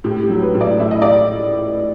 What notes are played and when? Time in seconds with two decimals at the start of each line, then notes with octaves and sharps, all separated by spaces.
0.04 A2 G4
0.23 G4
0.30 F#3
0.42 B4
0.55 A2
0.61 D5
0.79 A2 E5
0.91 D#5
1.02 D5